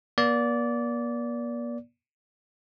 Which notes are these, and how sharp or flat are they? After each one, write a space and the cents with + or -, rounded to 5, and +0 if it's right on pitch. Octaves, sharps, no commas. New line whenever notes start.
A#3 +45 D5 -20